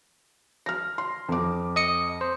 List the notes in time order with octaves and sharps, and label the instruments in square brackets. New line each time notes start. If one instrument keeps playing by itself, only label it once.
[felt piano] F6 A#6
C6
F2 D6
[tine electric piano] D#5 D#6 C#7
C5